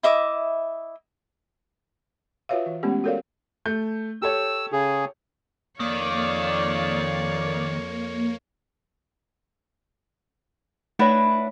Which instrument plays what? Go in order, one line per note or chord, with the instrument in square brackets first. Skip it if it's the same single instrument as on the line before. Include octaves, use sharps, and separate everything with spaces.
[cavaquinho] E4 D#5 E5 D6
[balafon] F4 F#4 B4 C#5 E5 F5
E3
G#3 A3 B3 C#4 G4
F#4 A4 A#4 C#5 D5 F5
[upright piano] A3 G6
[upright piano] G4 A4 C#5 [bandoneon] E6
[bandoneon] C#3 G#4
[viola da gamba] F2 C#5 [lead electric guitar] D#3 [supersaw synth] A#3 [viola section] D5 F5
[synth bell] A3 C#5 [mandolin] D4 E4 B4